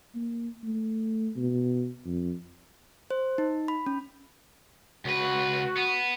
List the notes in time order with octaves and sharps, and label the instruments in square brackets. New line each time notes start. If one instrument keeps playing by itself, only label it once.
[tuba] A#3
A3
B2
F2
[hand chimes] C5
D#4
B5
C#4
[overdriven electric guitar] C#2 B4 [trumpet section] F#4
[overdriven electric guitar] B3